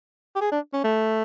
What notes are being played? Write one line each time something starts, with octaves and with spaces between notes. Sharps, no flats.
G4
G#4
D4
C#4
A3